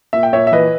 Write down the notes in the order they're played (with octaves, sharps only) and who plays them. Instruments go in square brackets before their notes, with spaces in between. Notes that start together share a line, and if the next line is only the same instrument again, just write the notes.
[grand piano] A#2 E5
G5
A#2 C#5 E5
E5
E3 B4 D#5